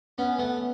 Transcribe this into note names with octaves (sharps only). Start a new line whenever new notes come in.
B3 C#4
A3 B3